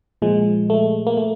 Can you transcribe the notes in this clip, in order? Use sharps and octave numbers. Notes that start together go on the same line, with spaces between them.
A#2 F3 G#3
A3
A#3
A3